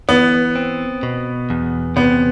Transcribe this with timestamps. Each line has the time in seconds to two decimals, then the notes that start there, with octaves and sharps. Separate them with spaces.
0.09 E3 B3
0.55 C4
1.03 B2
1.50 E2
1.96 C3 B3